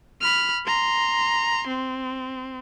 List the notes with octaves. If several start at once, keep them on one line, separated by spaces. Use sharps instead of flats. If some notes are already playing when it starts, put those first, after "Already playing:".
B5 F6
A#5 C6
C4